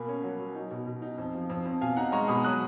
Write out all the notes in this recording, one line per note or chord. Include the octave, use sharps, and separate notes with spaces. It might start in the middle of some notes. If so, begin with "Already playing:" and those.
Already playing: B2 A#3 G#5 B5
C#4
F#3
F#3
D#4
B2
B2
D#4
F2
F3
F2
F2
B2 F5 G#5
D#4 F#5 A#5
G#3 A#5 C#6
B2 B5 D#6
F#3 D#6 F#6